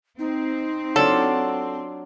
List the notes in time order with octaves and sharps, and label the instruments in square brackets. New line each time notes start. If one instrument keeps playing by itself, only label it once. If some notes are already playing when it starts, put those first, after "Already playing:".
[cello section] C4 [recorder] D#4
[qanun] F#3 D4 F4 [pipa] A4